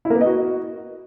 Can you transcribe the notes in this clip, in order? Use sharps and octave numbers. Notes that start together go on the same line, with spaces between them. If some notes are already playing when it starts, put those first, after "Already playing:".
E4
A#3
B3
D#5
F#4